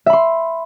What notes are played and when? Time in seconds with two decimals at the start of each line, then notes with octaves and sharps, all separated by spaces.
0.06 E5
0.10 B5
0.13 C6